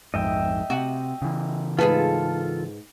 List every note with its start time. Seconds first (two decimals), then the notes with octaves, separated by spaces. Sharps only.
0.14 A#1 F2 G#2 D#5 E5 G5
0.70 C3 F#4
1.22 C#3 E3
1.79 G#2 F4 G#4 A4 B4 A5